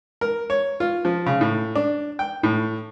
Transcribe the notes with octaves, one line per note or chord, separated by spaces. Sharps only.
A#4
C#5
F4
F3
C#3
A2
D4
G5
A2